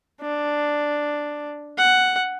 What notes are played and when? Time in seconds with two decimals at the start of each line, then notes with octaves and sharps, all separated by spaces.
0.22 D4
1.78 F#5